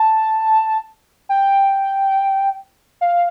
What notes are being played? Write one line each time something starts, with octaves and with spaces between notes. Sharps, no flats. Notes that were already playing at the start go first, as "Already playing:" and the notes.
Already playing: A5
G5
F5